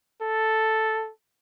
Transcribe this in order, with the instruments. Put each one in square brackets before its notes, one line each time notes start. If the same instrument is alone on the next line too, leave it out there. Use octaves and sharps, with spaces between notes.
[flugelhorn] A4